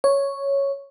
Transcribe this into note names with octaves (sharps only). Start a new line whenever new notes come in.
C#5